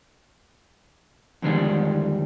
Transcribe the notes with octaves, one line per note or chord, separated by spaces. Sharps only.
F2 G#2 D3 D#3 G3 G#3